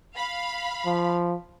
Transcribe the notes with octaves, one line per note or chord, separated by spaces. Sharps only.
F5 B5
F3